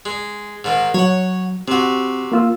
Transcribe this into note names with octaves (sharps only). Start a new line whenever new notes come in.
G#3
G#2 D#3
F#3 C#5 F#5
C3 C4 F#4
A#3 F4 E6